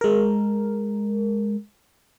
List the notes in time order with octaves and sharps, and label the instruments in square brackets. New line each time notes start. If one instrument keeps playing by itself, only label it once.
[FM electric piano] G#3 A#4